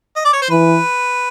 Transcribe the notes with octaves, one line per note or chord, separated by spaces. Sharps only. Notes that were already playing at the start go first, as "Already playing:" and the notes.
D#5
D5
C#5
C5
E3 B4